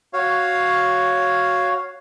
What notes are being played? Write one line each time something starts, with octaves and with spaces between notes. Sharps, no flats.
F#4 C#5 F5